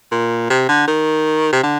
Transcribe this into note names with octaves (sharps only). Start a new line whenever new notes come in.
A#2
C3
D3
D#3
C3
D3